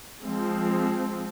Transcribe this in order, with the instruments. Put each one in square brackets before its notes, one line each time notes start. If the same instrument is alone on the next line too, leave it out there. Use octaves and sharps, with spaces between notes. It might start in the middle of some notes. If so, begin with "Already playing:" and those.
[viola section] F3 G#3 C4